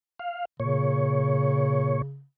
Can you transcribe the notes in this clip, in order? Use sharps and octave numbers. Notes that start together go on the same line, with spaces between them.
F5
A#2 C#3 C#5